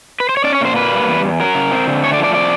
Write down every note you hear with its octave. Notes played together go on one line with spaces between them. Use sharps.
B4
C5
C#5
C#4 D5
C#5
A#2 C5
A#3 B4
G3
E2
E2
F#3 A#4
C#3
C4
D3
A3 C#5
D5
F3
D5
C4 D5